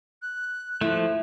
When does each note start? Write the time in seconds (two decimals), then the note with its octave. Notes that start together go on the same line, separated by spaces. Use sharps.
0.22 F#6
0.81 F3 A3 E4